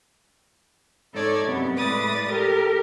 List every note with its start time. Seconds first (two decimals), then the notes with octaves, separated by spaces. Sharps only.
1.13 G#2 D#4 A4 C#5 D5 G#6
1.46 F#2 C3 B3
1.76 A2 G#3 B4 D5 D#6 A6
2.29 G4 A4 A#4